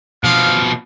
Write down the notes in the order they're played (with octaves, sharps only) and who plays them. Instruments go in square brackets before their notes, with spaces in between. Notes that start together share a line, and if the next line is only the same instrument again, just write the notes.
[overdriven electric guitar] B2 F3 [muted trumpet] F5